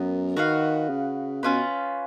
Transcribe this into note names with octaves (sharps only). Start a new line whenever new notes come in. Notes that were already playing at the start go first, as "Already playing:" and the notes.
Already playing: F#2 B3 A#4
D#3 F#4 B4 F5
C#3
B2 C#4 F4 B4